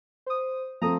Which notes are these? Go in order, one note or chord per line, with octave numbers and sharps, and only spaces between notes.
C5 D#6
F3 A3 C4 A#5 D#6